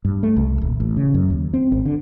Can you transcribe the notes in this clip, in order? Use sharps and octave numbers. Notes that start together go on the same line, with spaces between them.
G2
A3
C2
D#1
A1
C#3
F#2
D#2
C4
G#1
D3